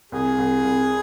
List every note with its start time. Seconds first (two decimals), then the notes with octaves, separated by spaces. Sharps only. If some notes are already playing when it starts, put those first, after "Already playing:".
0.12 C2 G#4
0.38 C2
0.64 C2